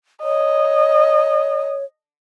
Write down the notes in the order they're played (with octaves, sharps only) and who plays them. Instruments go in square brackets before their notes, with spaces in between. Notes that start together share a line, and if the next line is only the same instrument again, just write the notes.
[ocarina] C#5 [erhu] D#5